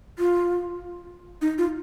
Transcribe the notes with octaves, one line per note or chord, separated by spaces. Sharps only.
F4
D#4
F4